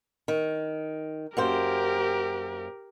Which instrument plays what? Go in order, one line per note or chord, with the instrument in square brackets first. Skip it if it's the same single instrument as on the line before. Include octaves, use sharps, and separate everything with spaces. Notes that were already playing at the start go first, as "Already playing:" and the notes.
[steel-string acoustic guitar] D#3
[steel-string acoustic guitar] F#2 A#3 C5 [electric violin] G4 A#4